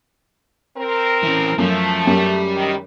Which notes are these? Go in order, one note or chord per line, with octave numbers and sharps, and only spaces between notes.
C4 A#4
E3 C#4
F#2 F3 A3
F#2 G3
D#3